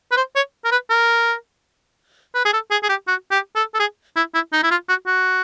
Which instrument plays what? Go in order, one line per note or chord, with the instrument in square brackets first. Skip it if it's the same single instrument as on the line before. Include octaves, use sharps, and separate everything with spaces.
[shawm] B4
C5
C#5
A#4
B4
A#4
B4
G#4
A4
G#4
G#4
G4
F#4
G4
A4
A4
G#4
E4
E4
D#4
E4
F4
F#4
F#4